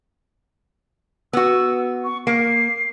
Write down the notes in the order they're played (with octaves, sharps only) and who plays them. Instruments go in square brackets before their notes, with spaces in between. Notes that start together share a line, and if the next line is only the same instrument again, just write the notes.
[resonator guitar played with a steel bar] B3 F#4 [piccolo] E6
[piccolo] C#6
[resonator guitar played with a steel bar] A#3 [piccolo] C7